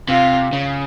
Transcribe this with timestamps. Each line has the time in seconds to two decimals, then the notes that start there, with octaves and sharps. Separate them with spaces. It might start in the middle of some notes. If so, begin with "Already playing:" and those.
0.08 C3 F4
0.53 C#3